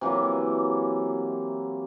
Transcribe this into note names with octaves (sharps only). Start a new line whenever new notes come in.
C3 E3 F#3 A#3